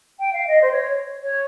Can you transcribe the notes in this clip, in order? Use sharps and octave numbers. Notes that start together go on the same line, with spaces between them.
G5
F5
D#5
C5
C#5
C#5